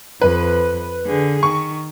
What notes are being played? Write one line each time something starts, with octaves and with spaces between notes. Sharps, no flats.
F2 B4
D3 G#4
D#3 C#6